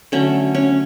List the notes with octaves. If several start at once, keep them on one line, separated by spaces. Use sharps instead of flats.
D3 F#3 A3 C#4
C#4